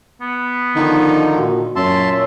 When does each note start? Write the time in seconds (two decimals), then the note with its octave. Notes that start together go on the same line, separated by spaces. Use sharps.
0.21 B3
0.76 D3 D#3 F3 D#4
1.35 A#2 F#4
1.76 F#2 A#2 C#4 C#5 E5 A5 C6